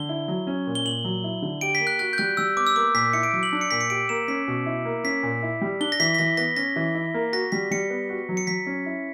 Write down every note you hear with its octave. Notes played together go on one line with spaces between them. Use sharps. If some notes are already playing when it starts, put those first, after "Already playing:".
Already playing: D3 G7
E4
F#3
C#4
A#2
G7
A#2 F#7
F#3
E4
D3
G4 D7
B6
A#3
F#6
F#4 F#6
G6
G3 F#6
G3 E6
B3 D6
E6
A#3 D6
A#2 B6
E4 C#7
D7
F#3
F#7
D4
C#7
A#2 B6
C#7
G4 D7
A#3 E7
C#4 B6
B2
E4
A#3
C#4 B6
A#2
E4
G3
D4 G7
A#6
E3 B6
B6
E3 A#6
B3 A#6
C#4 A#6
E3
E4
A#3
F#4 A#6
G3 B6
G3 C#7
B3
F#4
F#3
C#7
F#3 B6
C#4
E4